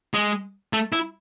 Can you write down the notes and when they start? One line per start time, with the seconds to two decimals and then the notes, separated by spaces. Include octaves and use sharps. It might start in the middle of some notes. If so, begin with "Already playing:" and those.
0.14 G#3
0.73 A3
0.92 E4